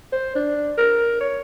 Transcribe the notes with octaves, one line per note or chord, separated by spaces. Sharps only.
C5
D4
A#4
C#5